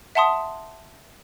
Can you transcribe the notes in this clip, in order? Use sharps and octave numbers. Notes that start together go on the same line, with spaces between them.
E5 F#5 A5 C6 D#6